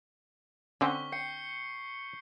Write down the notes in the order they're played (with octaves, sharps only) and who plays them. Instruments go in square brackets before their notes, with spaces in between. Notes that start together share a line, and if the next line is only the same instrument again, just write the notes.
[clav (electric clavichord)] D3 C4 [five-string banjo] C#4 F#5 [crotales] C#6 B6 G7
[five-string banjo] G5 [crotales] G6 C7 C#7